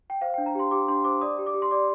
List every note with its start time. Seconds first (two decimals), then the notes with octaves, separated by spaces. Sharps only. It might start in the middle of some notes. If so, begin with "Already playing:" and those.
0.10 G5
0.21 C5 F5
0.34 G5
0.38 D4
0.46 A#5
0.55 G4 C6
0.71 G4 D6
0.88 D4 C6
1.04 C5 D6
1.21 D5 D#6
1.38 G4
1.46 D6
1.54 G4
1.62 C6
1.71 D5 D6